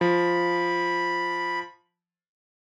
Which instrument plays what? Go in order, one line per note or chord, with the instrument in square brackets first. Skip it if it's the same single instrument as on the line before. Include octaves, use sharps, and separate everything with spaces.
[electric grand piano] F3 [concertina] B5